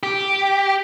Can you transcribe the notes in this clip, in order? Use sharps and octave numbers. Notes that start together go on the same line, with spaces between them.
G4